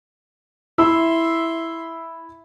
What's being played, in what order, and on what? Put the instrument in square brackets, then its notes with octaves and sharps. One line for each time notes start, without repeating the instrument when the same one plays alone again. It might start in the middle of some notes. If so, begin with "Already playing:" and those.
[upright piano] E4 B5 E6 [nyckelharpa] E5 C6